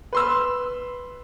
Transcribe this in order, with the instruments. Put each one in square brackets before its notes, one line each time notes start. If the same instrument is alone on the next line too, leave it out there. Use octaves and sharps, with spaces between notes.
[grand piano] B4 C6 E6